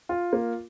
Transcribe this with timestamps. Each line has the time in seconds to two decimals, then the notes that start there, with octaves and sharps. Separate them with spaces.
0.09 F4
0.33 A#3